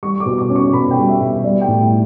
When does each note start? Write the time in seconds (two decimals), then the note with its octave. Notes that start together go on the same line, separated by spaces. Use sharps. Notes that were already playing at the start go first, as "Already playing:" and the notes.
0.03 G3 C#6
0.20 D6
0.26 B2
0.38 D6
0.50 C#4
0.56 C#6
0.73 B2 B5
0.91 G5
0.97 G3
1.08 E5
1.20 B2
1.44 G3 D5
1.61 G5
1.68 A2